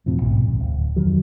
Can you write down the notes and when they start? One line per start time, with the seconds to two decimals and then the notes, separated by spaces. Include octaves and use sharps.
0.06 E1 A2 F3 C4
0.22 A#1 G#2 B2
0.44 D1 A#1
0.60 D1
0.96 F2 D#3 F#3